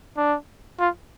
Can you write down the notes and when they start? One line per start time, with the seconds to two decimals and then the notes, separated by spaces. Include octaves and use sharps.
0.17 D4
0.80 F4